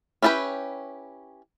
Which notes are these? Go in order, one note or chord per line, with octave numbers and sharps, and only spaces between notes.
C#4 E4 F4 G4 B4